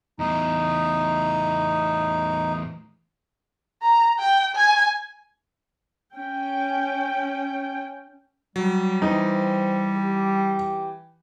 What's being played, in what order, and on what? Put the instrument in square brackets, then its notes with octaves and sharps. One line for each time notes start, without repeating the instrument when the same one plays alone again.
[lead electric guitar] E2 A2 [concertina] D#4
[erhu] A#5
G5
G#5
[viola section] C#4 G5
[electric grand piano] F#3 [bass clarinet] G3
[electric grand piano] E3 [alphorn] C4 [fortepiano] D#4
[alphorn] G4